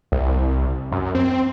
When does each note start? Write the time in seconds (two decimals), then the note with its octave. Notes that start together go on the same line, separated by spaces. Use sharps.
0.12 C2
0.92 F#2
1.15 C4